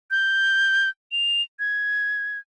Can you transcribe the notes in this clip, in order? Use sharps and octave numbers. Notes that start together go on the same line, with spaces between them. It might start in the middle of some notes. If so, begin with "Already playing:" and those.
G6
F7
G#6